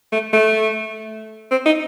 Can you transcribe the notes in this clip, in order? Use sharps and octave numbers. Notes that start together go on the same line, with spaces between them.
A3
A3
C4
D#4